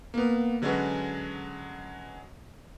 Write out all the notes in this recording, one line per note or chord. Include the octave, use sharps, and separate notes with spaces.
A#3 B3
D3 F#3 G#3 C#4 F#4 B4